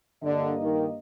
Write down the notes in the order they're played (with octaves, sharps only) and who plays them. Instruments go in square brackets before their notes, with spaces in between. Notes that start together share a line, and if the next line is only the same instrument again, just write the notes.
[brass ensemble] G2 A#3 D#5 [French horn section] D3
[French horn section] D#3